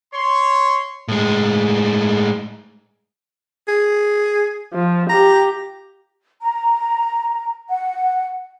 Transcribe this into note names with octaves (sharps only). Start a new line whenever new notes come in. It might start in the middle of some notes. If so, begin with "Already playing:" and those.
C#5 C6
A2 G#3
G#4
F3
G4 A#5
A#5
F#5